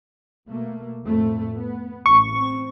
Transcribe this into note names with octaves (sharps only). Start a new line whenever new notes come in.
B2 A3 A#3
F2 A2 A3
B3
A1 C#6
C4